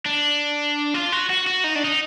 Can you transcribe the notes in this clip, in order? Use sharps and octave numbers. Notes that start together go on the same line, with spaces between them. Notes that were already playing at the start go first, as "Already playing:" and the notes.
D4
F4
F#4
F#4
F#4
D#4
D4
D#4